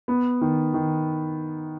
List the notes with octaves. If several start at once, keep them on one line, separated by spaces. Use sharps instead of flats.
B3
D#3
D#3